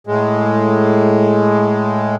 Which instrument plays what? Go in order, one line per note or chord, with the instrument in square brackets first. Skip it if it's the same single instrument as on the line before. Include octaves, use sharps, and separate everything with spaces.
[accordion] A2 G#3